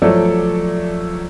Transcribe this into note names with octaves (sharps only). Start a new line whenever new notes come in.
F3 F#3 A3 A4 C#5 D5